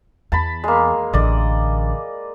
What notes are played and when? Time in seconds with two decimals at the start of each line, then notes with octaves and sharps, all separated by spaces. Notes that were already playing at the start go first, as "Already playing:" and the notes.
0.32 E2 A5 B5
0.64 G#3 A#3
1.13 A1 D3 D5 D#5